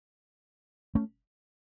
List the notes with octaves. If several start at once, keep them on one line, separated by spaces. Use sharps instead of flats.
A3 C#4